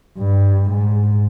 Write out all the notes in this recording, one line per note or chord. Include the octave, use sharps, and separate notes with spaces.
G2
G#2